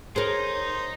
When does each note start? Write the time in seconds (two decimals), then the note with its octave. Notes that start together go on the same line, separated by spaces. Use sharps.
0.16 D#4 G#4 A#4 C5 C#5